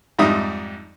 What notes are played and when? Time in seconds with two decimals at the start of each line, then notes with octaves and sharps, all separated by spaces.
0.19 F2 G#2 G3 D#4 E5 D#6